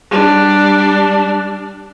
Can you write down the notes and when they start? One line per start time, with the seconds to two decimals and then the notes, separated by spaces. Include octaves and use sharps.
0.11 G3 D4